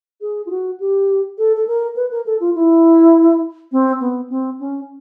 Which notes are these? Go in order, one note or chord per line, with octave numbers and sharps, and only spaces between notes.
G#4
F4
F#4
G4
A4
A4
A#4
B4
A#4
A4
F4
E4
C4
B3
C4
C#4